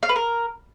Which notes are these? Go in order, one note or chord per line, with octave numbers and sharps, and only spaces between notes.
F5
B4
A#4